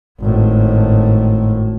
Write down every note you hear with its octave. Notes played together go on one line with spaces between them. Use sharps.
G#1 A2